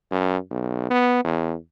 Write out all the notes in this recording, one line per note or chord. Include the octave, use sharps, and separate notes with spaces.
F#2
B1
B3
E2